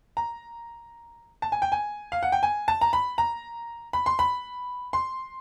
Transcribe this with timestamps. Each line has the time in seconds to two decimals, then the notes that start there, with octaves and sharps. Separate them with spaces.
0.17 A#5
1.42 A5
1.52 G#5
1.62 G5
1.72 G#5
2.12 F5
2.23 F#5
2.32 G5
2.43 G#5
2.68 A5
2.81 A#5
2.93 B5
3.18 A#5
3.93 B5
4.06 C6
4.19 B5
4.93 C6